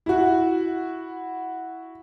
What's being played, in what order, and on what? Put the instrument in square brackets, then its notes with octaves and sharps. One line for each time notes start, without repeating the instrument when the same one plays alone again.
[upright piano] E4 F#4